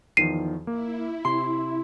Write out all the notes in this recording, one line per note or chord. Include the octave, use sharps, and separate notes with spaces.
E2 D#3 F3 C7 D#7
A#3 E4
C3 C6